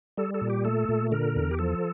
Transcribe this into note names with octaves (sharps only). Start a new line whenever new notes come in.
G3 A4
A4
A#2
G4
A3 A4
A#2
D3 A#4
E2
G4
F3 A4